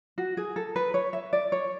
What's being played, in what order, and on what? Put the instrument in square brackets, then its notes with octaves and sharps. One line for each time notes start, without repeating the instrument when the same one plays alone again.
[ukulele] F#4
G#4
A4
B4
C#5
E5
D5
C#5